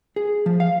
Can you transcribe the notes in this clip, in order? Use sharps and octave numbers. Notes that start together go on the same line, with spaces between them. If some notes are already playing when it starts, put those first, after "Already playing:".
G#4
F3
F5